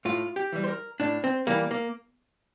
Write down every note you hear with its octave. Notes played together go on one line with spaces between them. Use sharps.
A2 F4
G4
E3 G3
C5
A#4
A2 D4
C4
E3 G3 A#3
A#3